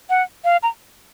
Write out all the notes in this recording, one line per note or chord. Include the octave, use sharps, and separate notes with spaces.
F#5
F5
A#5